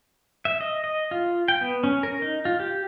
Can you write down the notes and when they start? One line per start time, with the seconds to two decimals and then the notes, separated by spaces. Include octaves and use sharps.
0.45 E5
0.61 D#5
0.84 D#5
1.11 F4
1.48 G5
1.61 B3
1.84 C#4
2.03 A#4
2.22 D#4
2.45 F4
2.60 G4